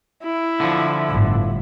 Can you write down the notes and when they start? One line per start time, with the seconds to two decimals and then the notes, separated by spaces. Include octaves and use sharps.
0.24 E4
0.60 D3 F3
1.07 G1 A2